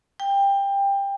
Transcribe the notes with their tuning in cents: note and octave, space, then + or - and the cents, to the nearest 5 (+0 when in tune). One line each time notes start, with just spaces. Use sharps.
G5 +20